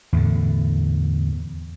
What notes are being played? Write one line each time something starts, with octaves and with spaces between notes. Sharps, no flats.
E2 A2 D3